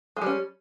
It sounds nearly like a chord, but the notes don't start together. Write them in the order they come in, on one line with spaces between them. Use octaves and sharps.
G#3 G3 C#4